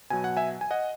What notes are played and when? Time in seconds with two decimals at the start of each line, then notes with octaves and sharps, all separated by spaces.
0.10 B2 F#3 G#5
0.24 F#5
0.37 E5 G#5
0.61 G#5
0.71 D#5 F#5